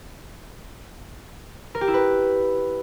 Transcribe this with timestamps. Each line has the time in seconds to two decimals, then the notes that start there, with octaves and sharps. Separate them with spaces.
1.75 A#4
1.81 G4
1.88 E4
1.94 B4